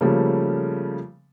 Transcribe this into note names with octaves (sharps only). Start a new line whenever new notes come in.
C#3 F3 G3 A3 A#3